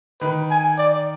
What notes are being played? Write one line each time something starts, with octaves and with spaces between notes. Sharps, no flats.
D#3 B4
G#5
D5